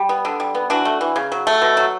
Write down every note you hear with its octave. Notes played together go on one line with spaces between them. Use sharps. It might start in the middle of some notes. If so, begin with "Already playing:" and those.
Already playing: G3
B3
D3
G3
B3
E3 D4 F#4
A3
E3
C#3
F#3
A3
B2
F#3